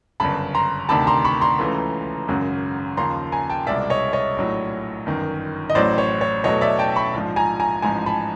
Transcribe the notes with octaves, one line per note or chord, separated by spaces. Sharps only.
G1 F#2 C#3 A5 B5
A#5 C6
D2 C3 D#3 A5 B5
A#5 C6
B5 C#6
A#5 C6
C#2 C#3 E3 A3
G#1 F#2 C#3 F#3
D#2 C#3 F3 A#5 C6
G#5 A#5
G5 A5
C2 B2 G#3 D5 E5
C#5 D#5
C#5 D#5
A#1 A2 F#3
G1 F#2 D#3
D#5
A1 A2 F#3 C5 D5
C#5
C#5
E2 B2 F#3 A3 C#5 D#5
D5 E5
G5 A5
B5 C#6
A#1 G#2 F3
G#5 A#5
G#5 A#5
A1 G#2 F3 G#5 A#5
A5 B5